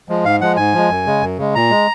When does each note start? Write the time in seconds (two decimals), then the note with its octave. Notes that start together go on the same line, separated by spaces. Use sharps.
0.09 F3 G#3
0.24 G#2 F5
0.41 F3 G#3 F#5
0.56 G#2 G#5
0.74 F3 G#3
0.90 F#2
1.06 C#3 G#3
1.22 F#2
1.38 C#3 G#3
1.55 A#2 A#5
1.71 G#3